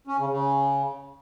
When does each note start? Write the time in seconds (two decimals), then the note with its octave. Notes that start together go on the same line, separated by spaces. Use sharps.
0.07 C#4
0.18 C#3
0.29 C#3